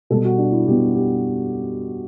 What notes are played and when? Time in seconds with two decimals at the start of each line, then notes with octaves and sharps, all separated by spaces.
0.10 B2 G3 B3 A4
0.25 F#4
0.39 D4
0.53 E4
0.67 B2 G3 B3 G4
0.95 G4